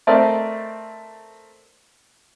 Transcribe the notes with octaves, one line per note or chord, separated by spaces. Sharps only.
A3 C4 A#4 D5 D#5